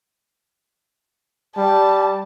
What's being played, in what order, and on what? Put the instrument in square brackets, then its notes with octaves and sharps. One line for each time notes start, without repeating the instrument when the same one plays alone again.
[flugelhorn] G3 [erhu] A5